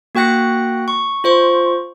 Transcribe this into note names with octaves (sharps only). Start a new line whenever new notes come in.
A#3 F#4 G5 F#6 A#6 C#7
C#6
F4 C5 C#6